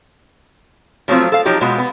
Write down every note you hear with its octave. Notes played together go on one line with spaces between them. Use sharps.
F3 F#3 A3 C4 F4
A4 F5
F3 F#3 D#4 G4
B2 G#3 F4 F#4
B3